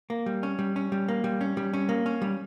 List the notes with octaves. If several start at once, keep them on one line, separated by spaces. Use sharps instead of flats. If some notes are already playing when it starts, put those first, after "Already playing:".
A#3
G3
C#4
G3
C#4
G3
A#3
G3
C#4
G3
C#4
A#3
C#4
G3